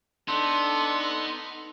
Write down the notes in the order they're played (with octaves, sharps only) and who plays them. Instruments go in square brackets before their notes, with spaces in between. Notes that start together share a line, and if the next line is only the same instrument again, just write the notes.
[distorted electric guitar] B3 [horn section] D4 A4 [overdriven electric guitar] D#4 [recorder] C6